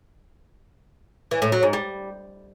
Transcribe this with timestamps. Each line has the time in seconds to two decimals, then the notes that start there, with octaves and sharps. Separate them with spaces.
1.31 E3
1.42 A2
1.52 F#3
1.63 G#2
1.73 G3